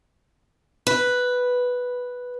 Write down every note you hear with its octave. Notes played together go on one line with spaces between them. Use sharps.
B4